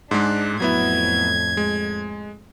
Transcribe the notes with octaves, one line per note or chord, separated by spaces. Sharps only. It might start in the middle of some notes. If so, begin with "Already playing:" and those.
G#2 G#3 D4 F#6
F2 A2 F#3 B3 E4 G#6
G#3